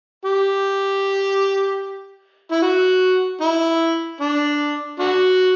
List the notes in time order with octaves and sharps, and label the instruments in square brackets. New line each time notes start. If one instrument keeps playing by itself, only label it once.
[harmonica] G4
E4
F#4
E4
D4
D4 F#4